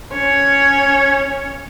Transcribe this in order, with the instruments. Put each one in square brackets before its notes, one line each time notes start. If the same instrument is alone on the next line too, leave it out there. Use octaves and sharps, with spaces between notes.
[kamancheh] C#4 C#5